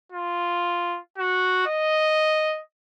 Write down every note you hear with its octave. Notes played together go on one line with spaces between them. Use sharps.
F4
F#4
D#5